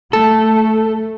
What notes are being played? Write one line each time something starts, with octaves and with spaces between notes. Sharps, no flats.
A3 A4